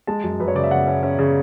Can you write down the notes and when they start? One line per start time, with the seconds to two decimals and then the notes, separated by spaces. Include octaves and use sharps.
0.07 G#3 A5
0.24 F#2
0.40 F#2 B4
0.48 C#5
0.55 C#3 D5
0.64 E5
0.71 C#3 F#5
0.87 C#4
1.03 C#4
1.19 C#3